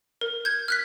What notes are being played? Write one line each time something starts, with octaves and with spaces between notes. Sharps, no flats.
A#4
G6 G#6
F6 F#6 B6